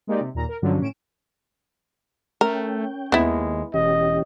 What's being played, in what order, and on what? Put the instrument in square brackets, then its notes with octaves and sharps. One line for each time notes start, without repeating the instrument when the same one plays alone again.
[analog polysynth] G#3 A#3 D#4 G4 D5
C3
D#2 A#2 A#5
A#4
G2 D3 F3 F#3 C#4
A2 C#4 D7 E7
[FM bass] A3 [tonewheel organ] C#4 G5 [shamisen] A#4
[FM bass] D#2 [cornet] G#3 [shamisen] B3 E4
[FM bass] E1 [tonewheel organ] E3 C#4 G4 [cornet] D#5